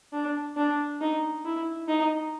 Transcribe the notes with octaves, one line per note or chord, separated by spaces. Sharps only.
D4
D4
D#4
E4
D#4